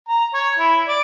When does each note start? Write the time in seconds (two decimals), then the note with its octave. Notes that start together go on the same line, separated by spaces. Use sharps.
0.09 A#5
0.34 C#5
0.59 E4
0.88 D5